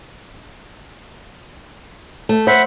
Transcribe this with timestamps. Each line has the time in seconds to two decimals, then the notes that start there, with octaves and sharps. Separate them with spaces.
2.29 A3
2.47 C5 E5 F#5 B5